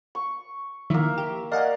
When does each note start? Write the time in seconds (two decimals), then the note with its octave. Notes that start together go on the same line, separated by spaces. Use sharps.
0.15 C#6
0.90 D#3 F3 A#3 E4 E5
1.18 G4
1.52 A#4 D5 D#5 F5 F#5 G#5